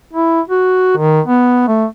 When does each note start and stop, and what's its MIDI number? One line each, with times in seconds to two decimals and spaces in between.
0.13 0.41 64
0.48 0.93 66
0.97 1.21 51
1.26 1.67 59
1.68 1.85 57